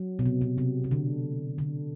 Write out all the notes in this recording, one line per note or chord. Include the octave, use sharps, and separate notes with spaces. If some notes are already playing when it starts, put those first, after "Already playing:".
Already playing: F#3
B2
C3
B2
C3
C3
D3
D3